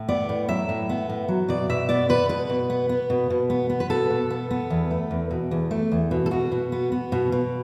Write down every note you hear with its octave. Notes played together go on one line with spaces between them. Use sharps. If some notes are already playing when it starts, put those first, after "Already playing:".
Already playing: A2
B3 D5
A2
F#3 E5
A2
B3
A2
F#3
B2 D5
B2 E5
B3 D5
B3 B4
B2 B4
B2
B3
B3
B2
B2
B3
B3
B4
B2 A4
B2
B3
B3
E2
A3
E2
B2
E2
A3
E2
B2
A4
B2 F#4
B2
B3
B3
B2
B2